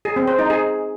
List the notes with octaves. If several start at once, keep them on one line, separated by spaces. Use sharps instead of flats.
G#4
C4
C5
D#4
G#4